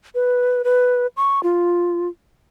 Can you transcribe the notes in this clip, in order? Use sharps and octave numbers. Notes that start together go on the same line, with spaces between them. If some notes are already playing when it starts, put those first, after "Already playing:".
B4
B4
C#6
F4